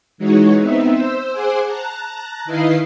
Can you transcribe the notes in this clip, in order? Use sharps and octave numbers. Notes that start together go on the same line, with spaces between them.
E3 G#3 D#4 F#4 C#5
B3 C4 D#4 E5
C5 E6
G#4 C5 F#5 G#5 D6
A5 A#5 F#6
D#3 E4 B4 D#5 F5 C7